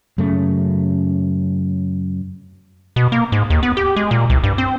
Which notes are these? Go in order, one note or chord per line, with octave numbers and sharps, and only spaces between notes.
F#2 C#3 A3
B2
A#3
G#2
D#2
B3
G4
G#3
A#2
C2
G2
C4